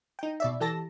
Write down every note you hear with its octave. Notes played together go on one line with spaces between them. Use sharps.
D#4 G5
B2 D5 E5
E3 G4 A4 A5 A#6